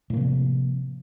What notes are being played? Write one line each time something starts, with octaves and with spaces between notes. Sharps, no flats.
A2 C3 F3 A#3